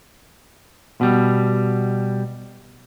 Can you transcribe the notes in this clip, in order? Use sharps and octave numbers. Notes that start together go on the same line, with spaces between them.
B2 G3